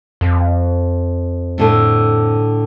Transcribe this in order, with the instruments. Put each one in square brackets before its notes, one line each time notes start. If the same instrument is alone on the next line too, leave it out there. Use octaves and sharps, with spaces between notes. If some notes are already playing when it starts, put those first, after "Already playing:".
[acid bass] F2
[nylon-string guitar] A2 D3 A3